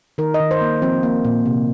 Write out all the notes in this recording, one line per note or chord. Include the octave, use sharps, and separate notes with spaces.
D#3 A#4
D#5
D#3
C5
A#3
F3 C4
A#3
A#2
C3